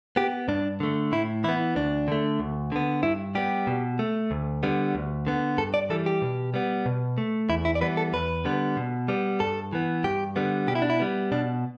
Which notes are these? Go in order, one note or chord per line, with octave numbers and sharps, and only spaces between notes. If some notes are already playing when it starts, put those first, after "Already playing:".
B3 G4
G2 D4
D3 A3
A2 E4
E3 B3 E4
D2 D4
D3 A3
D2
D3 B3
G2 E4
G3 B3 G4
B2
A3
D2
D3 G3 B3
D2
D3 B3
G2 A4
D5
E3 G3 A4
G4
B2
G3 B3
B2
A3
E2 E4
E4
D5
E3 G3 B3 B4
A4
E2 B4
D3 G3 B3
B2
G3 B3
G2 A4
E3 B3
G2 G4
D3 G3 B3
B2 G4
E4
D4
E4
G3 B3
B2 D4